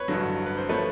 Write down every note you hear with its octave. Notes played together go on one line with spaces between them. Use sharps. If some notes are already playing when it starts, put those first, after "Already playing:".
Already playing: B4 C#5
A1 G2 D3 F#3
B4
C5
F3 A3 B4 C#5